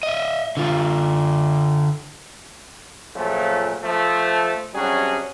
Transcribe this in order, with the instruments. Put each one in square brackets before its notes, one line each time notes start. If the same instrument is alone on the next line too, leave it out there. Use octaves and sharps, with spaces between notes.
[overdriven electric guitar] D#5 E5
D3 F4
[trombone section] A#2 C#3 F3 F#3 A3
F3 A3
C3 F#3 G3 C#4 D4 G#4